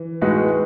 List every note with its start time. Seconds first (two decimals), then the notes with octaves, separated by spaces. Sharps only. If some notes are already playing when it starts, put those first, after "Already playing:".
Already playing: E3
0.21 A2 G#3 D#4 F#4 B4